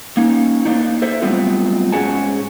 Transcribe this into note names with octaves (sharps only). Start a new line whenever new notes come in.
A#3 C#4 D#4
A#3 D4 D#4
A4 C5 E5
F#3 G3 A3 B3 C4 F4
G#2 C#4 G#4 F#5 G#5 A5